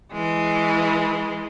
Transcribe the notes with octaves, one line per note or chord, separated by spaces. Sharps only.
E3 G#3